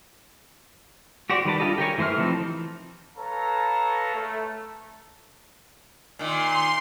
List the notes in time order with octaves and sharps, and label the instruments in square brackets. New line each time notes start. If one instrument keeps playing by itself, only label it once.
[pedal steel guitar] F#4 G4 C5 D5
D#3 G3 B4 A5
D4 F4 G4 A4 D#5
G4 A#4 C#5 G#5
E3 A3 C5 E5 F6
E3 F3 C4 D#4 A5
[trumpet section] A4 B4 C#5 F5 A5 A#5
A3
[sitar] A#2 D#3 [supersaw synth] C6